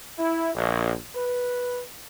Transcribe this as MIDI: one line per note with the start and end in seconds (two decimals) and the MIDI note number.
0.18 0.53 64
0.55 0.93 34
1.15 1.81 71